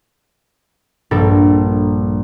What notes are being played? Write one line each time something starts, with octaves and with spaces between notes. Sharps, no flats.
A#1 G2 A4 A#4 A6